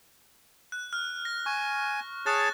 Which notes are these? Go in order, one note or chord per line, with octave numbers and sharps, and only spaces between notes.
F#6
F6
A#6
G#5 C#6
G#4 C#5 A5 F#6 A6